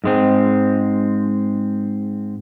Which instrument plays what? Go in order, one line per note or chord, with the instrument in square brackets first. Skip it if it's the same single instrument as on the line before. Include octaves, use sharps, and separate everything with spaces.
[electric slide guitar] G#2 G#3 C4